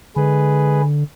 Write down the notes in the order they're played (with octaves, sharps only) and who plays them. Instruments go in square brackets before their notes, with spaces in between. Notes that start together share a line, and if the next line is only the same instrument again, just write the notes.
[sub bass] D3 [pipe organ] G#3 G#4 B4